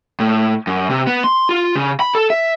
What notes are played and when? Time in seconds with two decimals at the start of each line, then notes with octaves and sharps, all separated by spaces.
0.20 A2
0.67 F#2
0.90 C3
1.07 B3
1.24 C6
1.49 F4
1.76 C#3
2.00 B5
2.15 A4
2.30 E5